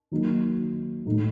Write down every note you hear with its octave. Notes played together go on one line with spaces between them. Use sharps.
D#3 F#3 A#3 D#4
A2 A3 D#4